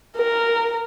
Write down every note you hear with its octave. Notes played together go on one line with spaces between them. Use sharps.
A#4